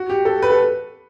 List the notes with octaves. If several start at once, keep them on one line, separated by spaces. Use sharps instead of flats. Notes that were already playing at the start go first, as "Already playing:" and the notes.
Already playing: F#4
G4
A4
B4
A4